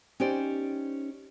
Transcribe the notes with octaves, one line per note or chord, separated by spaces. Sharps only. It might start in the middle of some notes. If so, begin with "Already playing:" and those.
C#4 D#4 G4 C5 D5